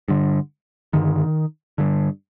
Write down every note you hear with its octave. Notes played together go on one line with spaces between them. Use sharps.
G2 D3
G2 D3 D#3
G2 D3